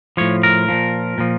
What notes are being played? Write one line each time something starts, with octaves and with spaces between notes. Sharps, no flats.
A2 F3 C#5
A#4
A#2 F3
A#2 F3